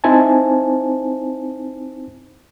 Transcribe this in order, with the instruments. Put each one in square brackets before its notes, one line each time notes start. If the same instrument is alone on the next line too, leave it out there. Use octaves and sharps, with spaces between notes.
[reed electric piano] C4 D#4 E4 C5 G#5 A5